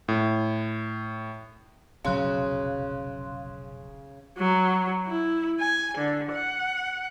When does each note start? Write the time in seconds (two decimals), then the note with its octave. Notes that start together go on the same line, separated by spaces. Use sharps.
0.08 A2
2.05 F1 B1 C#3 F#3 F5 C6 F#6
4.38 F#3
5.07 E4
5.60 G#5
5.98 D3
6.33 F#5